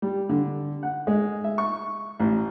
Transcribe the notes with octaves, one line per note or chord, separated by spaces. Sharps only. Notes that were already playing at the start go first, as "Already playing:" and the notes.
G3
D3
F#5
G#3
E5
C#6
A1